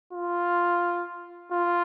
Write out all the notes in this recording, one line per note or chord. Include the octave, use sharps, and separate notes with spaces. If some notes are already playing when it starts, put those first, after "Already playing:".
F4
F4